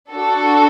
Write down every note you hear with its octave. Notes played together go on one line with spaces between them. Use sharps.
D4 F#4 A4